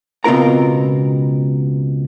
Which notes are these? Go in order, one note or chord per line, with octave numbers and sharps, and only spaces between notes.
C#2 B2 C4 F4 A#4 A#5